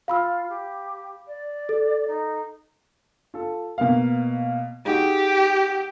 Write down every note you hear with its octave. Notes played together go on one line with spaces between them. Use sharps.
F4 F5 B5 E6
G4
D5
A4
D#4
F4 A4
B2 A#3 F5
G#3 D#4 F#4 G4